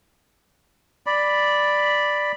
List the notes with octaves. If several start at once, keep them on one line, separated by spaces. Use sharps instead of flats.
D5 B5